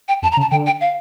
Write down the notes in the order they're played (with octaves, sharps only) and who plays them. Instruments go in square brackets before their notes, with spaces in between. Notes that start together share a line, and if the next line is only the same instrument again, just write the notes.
[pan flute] G5
[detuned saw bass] F2 [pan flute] A5
[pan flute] A#5
[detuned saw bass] C#3
[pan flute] A5
[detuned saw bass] D3 [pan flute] G5
[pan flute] G5
F5